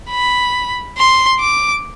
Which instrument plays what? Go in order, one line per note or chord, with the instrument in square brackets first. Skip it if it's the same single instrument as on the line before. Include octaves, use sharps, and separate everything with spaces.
[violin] B5
C6
D6